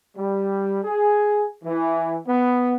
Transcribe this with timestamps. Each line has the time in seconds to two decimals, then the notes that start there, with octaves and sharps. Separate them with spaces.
0.17 G3
0.84 G#4
1.64 E3
2.26 B3